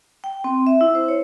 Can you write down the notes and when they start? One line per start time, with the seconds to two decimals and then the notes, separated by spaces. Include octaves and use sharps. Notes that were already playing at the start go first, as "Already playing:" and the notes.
0.24 G5
0.44 C4
0.67 E5
0.81 E4
0.95 C5
1.08 C#5